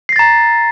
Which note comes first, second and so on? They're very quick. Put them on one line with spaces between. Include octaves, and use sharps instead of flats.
C7 A#6 A6 A#5